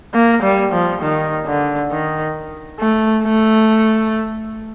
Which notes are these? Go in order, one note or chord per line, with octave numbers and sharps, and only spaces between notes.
A#3
G3
F3
D#3
D3
D#3
A3
A3